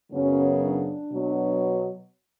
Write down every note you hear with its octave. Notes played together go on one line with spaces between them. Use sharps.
F#2 C#3 F#3 B3 C#4
D4
B2 F#3 B3